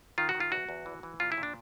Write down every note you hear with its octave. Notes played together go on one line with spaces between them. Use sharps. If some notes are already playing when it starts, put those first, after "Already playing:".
D#3 F4
F#4
D#3
F4
E2 F#4
E2
E3
E3
A#2 F4
E4
A#2
D4